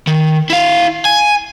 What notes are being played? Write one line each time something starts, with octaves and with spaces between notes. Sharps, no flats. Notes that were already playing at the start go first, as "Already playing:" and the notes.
D#3
E4 F5
G#5